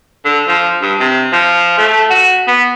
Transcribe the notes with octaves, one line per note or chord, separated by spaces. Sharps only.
D3
F3
G2
C3
F3
A3
F#4
B3